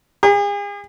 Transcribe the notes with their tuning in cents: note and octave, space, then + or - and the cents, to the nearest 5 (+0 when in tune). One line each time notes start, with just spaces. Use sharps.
G#4 -40